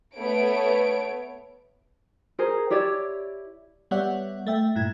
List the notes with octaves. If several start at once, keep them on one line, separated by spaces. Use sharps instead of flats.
A3 B3 C#5 D7
G#4 A#4 C5
E4 G4 C#5 D5
G3 B3 C#5 D5 E5 F#5
A3 E5 G5
G2 A#2 E4 G#6